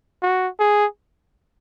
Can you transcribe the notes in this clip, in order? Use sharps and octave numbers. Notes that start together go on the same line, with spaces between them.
F#4
G#4